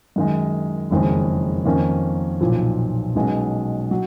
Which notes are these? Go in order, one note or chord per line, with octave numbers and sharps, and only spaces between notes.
F#2 D#3 G#3
F#1 F2 D#3 G#3
F2 D#3 A#3 C#4
B1 A#2 F3
B1 B2 G#3 C#4
F#3